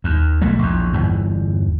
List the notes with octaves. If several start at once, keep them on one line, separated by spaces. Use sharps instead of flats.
D#2
B1 F#3 A3
A#1 E2
G1 E2 E3